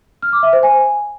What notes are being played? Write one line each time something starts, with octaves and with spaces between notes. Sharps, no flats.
F6
D6
E5
C5
G#5